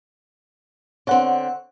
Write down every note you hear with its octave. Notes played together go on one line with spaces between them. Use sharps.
D3 C4 C#5 F#5